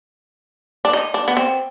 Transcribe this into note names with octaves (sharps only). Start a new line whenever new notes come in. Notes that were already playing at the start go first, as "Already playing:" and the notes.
D4
D#4
D4
B3
C4